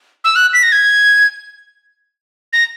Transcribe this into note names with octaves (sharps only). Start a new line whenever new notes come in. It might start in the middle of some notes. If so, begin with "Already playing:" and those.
E6
F#6
B6
A#6
G#6
A#6